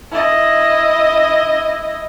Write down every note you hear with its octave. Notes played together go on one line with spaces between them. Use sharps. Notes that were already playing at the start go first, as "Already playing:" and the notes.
E4 D#5